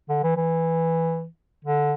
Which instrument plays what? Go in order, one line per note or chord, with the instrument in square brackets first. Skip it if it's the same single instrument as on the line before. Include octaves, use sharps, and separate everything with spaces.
[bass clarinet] D3
E3
E3
D3